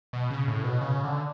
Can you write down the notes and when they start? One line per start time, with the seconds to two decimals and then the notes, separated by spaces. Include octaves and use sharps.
0.13 B2
0.30 C#3
0.47 A2
0.64 B2
0.81 C#3
1.04 D3